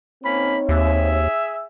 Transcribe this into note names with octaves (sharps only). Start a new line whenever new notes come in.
A#3 C4 C#4 D#4 C#5 B5
D#2 G#4 E5